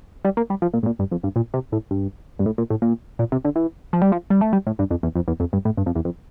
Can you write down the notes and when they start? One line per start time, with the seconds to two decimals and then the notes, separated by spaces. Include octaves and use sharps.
0.25 G3
0.37 A#3
0.50 G3
0.62 F3
0.73 A#2
0.83 A2
0.86 A#2
0.99 G2
1.11 F2
1.23 G2
1.36 A#2
1.54 C3
1.72 A2
1.91 G2
2.39 G2
2.46 A2
2.58 A#2
2.70 A2
2.82 A#2
3.19 A#2
3.32 C3
3.45 D3
3.56 E3
3.93 F3
4.02 G3
4.12 F3
4.30 G3
4.41 A3
4.53 G3
4.67 A2
4.79 G2
4.91 F2
5.03 E2
5.16 F2
5.28 E2
5.40 F2
5.53 G2
5.65 A2
5.77 G2
5.86 F2
5.95 E2
6.05 F2